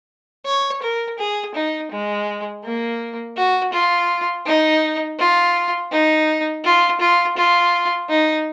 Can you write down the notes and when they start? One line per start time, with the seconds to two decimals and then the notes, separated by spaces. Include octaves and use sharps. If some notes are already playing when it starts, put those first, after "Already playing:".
0.46 C#5
0.83 A#4
1.19 G#4
1.55 D#4
1.92 G#3
2.64 A#3
3.37 F#4
3.73 F4
4.46 D#4
5.19 F4
5.92 D#4
6.65 F4
7.00 F4
7.37 F4
8.09 D#4